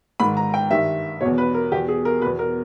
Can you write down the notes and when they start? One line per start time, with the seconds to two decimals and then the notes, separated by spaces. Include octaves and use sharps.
0.20 G#2 D#3 B5
0.37 A#5
0.54 G5
0.71 G2 D#3 E5
1.21 E2 B2 C#5
1.38 B4
1.54 A#4
1.72 E2 B2 G4
1.89 G#4
2.05 A#4
2.22 E2 B2 B4
2.39 A#4